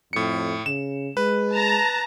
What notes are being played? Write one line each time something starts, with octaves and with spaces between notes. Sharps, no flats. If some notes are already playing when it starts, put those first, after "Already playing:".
F2 A2 C#7
C#3 E7
G#3 B4
A5 A#5